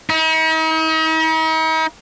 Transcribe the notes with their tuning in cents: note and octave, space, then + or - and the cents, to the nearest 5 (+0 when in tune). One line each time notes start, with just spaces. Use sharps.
D#4 +45